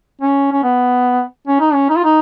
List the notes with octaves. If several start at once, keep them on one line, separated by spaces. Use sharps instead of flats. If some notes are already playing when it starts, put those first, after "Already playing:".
C#4
C#4
B3
C#4
D#4
C#4
D#4
F4
D#4